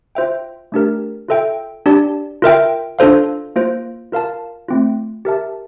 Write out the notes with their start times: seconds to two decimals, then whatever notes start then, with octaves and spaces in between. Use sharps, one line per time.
0.15 F4 C5 E5 G5
0.72 A3 D4 G4 A#4
1.28 F4 A4 E5 G5
1.86 D4 G4 D5 A5
2.42 F4 A#4 E5 G5
2.99 D4 F4 A4 C5 F5
3.56 A#3 F4 C5
4.12 F4 A#4 F5 A5
4.68 A3 C4 F4
5.25 G4 A#4 E5 A5